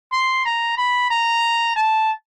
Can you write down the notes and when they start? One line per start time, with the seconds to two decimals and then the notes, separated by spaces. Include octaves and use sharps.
0.12 C6
0.45 A#5
0.78 B5
1.11 A#5
1.76 A5